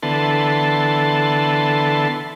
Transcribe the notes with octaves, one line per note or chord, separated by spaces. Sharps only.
D3 E3 B3 A4 A5 C6